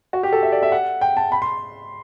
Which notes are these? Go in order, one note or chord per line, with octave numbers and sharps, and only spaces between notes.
F#4
G4
A4
E5
D5
E5
F#5
G5
A5
B5
C6